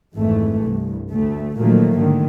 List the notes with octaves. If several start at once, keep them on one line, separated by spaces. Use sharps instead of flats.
G#1 F2 E3 A3
C2 G2
D2 A3
A#2 D#3 F3 F#3 A3 A#3
G#2 D3 D#3